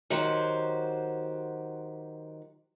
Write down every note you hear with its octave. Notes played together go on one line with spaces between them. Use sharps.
D#3 F#3 F#4 G4 C5